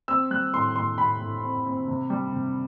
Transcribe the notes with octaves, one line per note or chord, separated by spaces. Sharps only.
C4 E6
G3 F#6
A2 C6
A2 C6
A2 B5
A2
C4
C4
C3
G3
C3